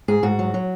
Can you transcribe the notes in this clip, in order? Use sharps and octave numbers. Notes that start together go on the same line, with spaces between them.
G#2 G#4
G#2 F#4
F#3
F#3